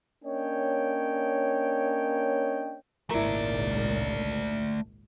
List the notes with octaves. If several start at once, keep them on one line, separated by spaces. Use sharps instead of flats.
A#3 C#4 D4 C#5 D#5 G5
G#1 C#2 A#2 A3 E4 A#4 D5